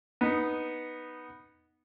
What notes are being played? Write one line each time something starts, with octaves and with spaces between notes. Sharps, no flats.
B3 D#4 D#5